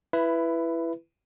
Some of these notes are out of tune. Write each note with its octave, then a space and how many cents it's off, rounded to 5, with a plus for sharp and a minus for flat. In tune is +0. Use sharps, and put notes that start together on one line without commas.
E4 +15 B4 +0